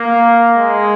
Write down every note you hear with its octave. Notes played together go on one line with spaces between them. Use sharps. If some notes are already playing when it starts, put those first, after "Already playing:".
Already playing: A#3
G#3